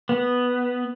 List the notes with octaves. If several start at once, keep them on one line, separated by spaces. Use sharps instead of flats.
B3